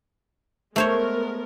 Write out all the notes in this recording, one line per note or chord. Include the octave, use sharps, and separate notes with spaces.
G#3 A3 B3 A#4 C5 C#5